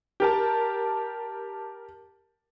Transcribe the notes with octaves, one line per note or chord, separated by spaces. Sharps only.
G4 A#4 A5